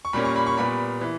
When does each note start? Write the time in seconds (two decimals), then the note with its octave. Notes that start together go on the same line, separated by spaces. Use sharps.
0.05 C#6
0.13 A#2 G3 A#3 C#4 B5
0.25 C#6
0.36 B5
0.47 C#6
0.57 A#2 G3 B3 B5
1.01 E3